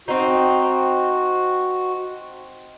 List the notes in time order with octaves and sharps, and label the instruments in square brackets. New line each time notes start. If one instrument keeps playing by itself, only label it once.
[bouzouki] C4 D#4 [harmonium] F#4